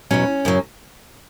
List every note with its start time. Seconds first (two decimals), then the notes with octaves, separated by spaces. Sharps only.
0.11 E2 B2 F#3 C#4
0.45 F#2 C#3 F#3